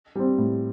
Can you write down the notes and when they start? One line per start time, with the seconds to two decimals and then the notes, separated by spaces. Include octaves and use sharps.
0.15 G3 C4
0.38 A2